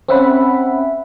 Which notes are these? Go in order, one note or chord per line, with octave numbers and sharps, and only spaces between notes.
C4 C#4 E5 F#5 B5